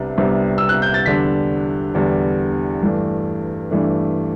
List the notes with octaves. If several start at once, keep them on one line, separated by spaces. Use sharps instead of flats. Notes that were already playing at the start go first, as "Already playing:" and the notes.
Already playing: C2 C3 G3 B3 D4
C2 C3 G3 B3 D4
E6
F#6
G6
A6
E2 D3 G3 D4 B6
E2 D3 G3 D4
G2 E3 A3 D4
G2 E3 A3 D4